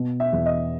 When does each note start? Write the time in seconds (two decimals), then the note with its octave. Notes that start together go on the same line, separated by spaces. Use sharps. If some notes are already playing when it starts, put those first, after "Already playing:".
Already playing: B2
0.20 E5
0.33 E2
0.46 D#5